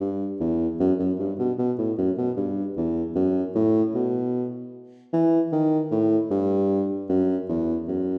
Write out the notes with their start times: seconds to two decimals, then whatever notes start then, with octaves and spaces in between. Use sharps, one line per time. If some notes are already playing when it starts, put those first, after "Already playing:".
0.01 G2
0.40 E2
0.80 F#2
1.00 F#2
1.19 G2
1.39 B2
1.59 B2
1.79 A2
1.98 F#2
2.18 B2
2.37 G2
2.77 E2
3.16 F#2
3.56 A2
3.95 B2
5.13 E3
5.52 D#3
5.92 A2
6.31 G2
7.10 F#2
7.49 E2
7.88 F#2